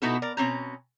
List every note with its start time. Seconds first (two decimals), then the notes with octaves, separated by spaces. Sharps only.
0.02 B2 B3 D#4 E4 F#4 A4
0.22 A#4 D5
0.37 B2 C4 C#4 A#5